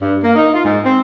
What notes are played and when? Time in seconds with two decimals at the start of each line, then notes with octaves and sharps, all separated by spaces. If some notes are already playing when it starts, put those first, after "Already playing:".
0.01 G2
0.22 A#3
0.36 D#4
0.54 F4
0.65 G#2
0.84 C4